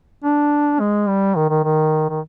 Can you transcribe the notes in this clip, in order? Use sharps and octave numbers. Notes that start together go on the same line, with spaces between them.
D4
G#3
G3
D#3
D#3
D#3
D#3